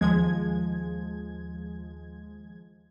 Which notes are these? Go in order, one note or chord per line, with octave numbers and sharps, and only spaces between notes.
D#2 F3 G#3 G#6